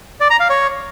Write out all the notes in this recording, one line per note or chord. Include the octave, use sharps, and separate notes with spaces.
D5
A#5
F5
C#5